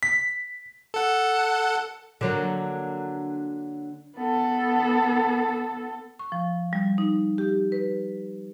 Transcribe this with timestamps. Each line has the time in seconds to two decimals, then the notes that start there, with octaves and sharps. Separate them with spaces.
0.03 B6
0.94 A4 F#5
2.21 D3 F#3 A#3
4.17 B3 A4
6.19 C#6
6.32 F3
6.73 G3
6.98 D#4
7.38 G4
7.72 B4